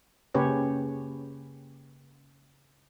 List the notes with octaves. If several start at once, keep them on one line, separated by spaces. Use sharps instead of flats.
C#3 A#3 C#4 G4 B4 C#5